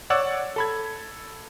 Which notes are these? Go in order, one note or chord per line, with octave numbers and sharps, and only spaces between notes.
C#5 D5 F#5 E6
A4 B5 G#6